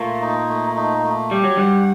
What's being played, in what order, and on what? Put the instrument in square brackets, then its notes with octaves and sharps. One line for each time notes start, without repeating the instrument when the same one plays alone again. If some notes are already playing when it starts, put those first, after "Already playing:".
Already playing: [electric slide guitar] A#2 A#3 [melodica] A3
[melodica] D#4
A3
D#4
A3
[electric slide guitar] G3 [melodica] G4
[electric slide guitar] F#3
[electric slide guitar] G2 G3 [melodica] F#5